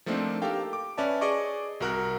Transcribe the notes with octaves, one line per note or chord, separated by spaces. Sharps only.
F3 A3 A#3 C4 D4 D#4
G4 A4 A#4 F5 G5
D6
C#4 B4 D5 E5 A5
G#4 D5 D#5 C#6 D6
C2 F#4 A#4 F#5 F#6